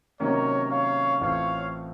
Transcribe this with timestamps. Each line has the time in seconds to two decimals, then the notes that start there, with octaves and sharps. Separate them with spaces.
0.19 C3 D#3 F#3 A#3 C#4 A#4 C#5
0.70 C#5 F5
1.21 A1 A2 A3 C4 F4 C#5 F5